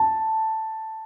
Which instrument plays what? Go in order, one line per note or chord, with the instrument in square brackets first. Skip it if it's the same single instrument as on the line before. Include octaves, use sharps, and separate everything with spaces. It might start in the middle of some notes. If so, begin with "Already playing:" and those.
Already playing: [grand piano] A5